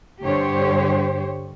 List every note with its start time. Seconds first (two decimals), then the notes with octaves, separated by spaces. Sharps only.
0.23 G2 D3 G4 C5 C#5